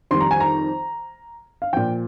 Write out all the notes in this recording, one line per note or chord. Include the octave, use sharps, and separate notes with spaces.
F2 D#3 G3 C6
A#5
G#5
A#5
F5
A#2 F3 G5